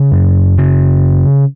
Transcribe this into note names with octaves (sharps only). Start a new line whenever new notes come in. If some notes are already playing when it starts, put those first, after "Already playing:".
Already playing: C#3
F#2
C#3